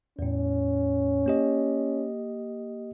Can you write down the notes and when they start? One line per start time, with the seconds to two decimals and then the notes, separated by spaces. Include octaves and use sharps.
0.19 E2 A2 C#4
1.26 A#3 G4 D#5